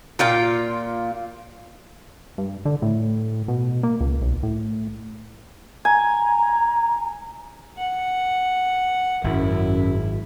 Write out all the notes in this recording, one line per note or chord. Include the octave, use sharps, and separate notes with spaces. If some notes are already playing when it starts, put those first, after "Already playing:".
A#2 F4 G5
G2
D3
A2
B2
A#3
C#2
B1
A2
G#5 A#5
F#5
G#1 F#2 E4